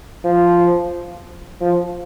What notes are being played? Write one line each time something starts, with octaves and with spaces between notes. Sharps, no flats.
F3
F3